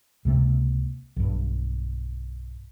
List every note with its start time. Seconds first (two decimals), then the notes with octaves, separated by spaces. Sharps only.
0.25 C#2 C3 A#3
1.16 B1 G2